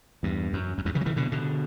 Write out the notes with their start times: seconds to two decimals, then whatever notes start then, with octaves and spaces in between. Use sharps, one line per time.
0.23 E2 G2
0.53 F#2
0.78 F#2
0.85 E2 G2
0.95 C#3 E3
1.01 F#3
1.06 C#3 E3
1.16 B2 D3
1.32 B2 D3